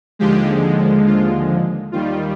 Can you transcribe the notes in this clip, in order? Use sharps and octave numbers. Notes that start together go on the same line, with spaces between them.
D#2 D3 F3 G#3 G4
F4
D#2 D#3 G3 F4